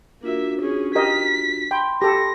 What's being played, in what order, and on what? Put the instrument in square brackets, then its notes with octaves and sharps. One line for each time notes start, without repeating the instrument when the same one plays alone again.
[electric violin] A#3 E5 [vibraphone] D4 F4 F#4
[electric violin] C#4 G#4
[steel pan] G4 A#4 D#5 [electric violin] B6
[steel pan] G5 [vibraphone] B5 C6
[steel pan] G4 A4 [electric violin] A#6